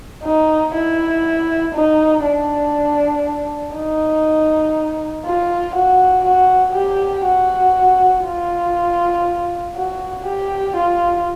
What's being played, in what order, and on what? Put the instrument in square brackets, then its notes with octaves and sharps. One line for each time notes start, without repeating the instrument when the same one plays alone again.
[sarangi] D#4
E4
D#4
D4
D#4
F4
F#4
F#4
G4
F#4
F4
F#4
G4
F4